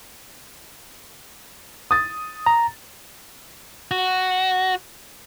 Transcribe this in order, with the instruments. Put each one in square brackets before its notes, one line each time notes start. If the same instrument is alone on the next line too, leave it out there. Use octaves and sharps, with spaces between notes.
[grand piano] D#6 A6
[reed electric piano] A#5
[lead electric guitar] F#4